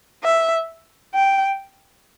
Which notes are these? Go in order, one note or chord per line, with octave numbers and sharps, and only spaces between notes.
E5
G5